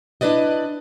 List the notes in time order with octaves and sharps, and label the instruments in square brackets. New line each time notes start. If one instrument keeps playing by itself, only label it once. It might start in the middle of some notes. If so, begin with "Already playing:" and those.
[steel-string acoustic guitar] D4 E4 B4 D5 D#5